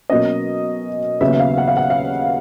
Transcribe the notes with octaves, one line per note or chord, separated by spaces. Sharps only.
B2 F#3 A#3 C#4 D#5
D#2 C#3 F#3 B3 E5
E5
F5
F#5
F5
F#5
F5